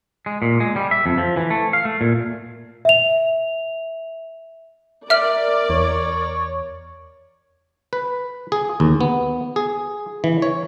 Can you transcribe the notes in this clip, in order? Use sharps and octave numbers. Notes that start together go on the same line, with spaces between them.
G#3
A#2
G#3
G3
E5
F2
F3
E3
A3
F5
A3
A#2
E5 F7
A#4 D5 E5 F6
E2 C#5
B4
G#4
D#2
B3
G#4
E3
C#5